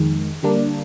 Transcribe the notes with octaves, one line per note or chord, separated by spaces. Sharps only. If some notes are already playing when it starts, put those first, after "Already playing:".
Already playing: F2 D#3 G#3
D3 G3 A#3 D4